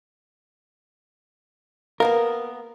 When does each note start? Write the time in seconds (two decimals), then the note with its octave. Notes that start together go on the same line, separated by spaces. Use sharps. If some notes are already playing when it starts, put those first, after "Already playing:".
2.00 A#3 B3 A#4 F5